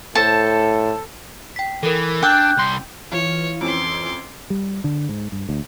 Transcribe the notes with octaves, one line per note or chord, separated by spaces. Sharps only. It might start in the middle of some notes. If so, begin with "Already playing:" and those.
A2 A4 C5 A5
G5 B6
E3 A4 A#4
D4 G5 D6 E6 F#6
C2 C6
E3 F4 C#5
F2 C4 C#4 C6 D6
G3
D3
G#2
G2
D2